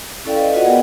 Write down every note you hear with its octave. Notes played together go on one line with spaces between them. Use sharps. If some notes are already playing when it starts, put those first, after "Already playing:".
C#4 E4 A4 D5 F5 G5
B4 D#5
F4 F#4 B4 D5 D#5 F#5
B3 G#4 A#4 D#5 G5